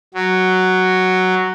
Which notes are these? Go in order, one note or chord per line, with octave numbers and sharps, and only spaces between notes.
F#3